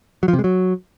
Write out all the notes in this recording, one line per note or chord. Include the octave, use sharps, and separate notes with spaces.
F#3
F3
C3
G#3
F#3